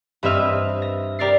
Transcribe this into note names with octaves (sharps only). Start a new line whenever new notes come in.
G2 C4 B4 D#5 E5 F6
A#6
G4 A#4 D5 A6 C7